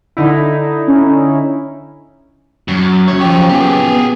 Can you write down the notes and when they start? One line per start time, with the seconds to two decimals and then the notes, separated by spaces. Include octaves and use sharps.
0.17 D3 D#4 E4
0.87 C#4
2.68 F#2 F#3
3.08 F#2 C#3 C#5
3.21 F3 G4 C#5
3.49 B3 G4 G#4